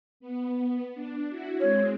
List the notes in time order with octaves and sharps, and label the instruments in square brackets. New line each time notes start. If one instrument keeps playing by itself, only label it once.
[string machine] B3
D4
E4 F#4
[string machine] G#3 C4 [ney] C#5